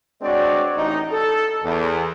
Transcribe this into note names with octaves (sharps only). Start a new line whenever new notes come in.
G#3 C4 D4 F#4 C#5 D5
A1 D#4
A4
E2